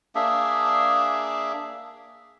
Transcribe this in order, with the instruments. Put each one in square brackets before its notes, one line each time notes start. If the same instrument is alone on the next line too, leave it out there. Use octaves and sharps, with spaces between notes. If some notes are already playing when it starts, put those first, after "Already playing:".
[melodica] A#3 D4 G#4 E5